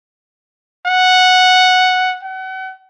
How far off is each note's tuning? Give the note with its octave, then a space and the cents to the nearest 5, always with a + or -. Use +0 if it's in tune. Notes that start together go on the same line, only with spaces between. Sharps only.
F#5 -5
F#5 +35